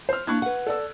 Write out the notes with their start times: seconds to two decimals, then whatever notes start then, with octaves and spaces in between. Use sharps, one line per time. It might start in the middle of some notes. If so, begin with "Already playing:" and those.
0.09 C5 F6
0.27 A#3 D4 E4 C#6 F#6 G#6
0.42 B4 F#5
0.67 A4 D5 E6